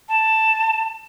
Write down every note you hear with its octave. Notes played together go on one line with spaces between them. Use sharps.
A5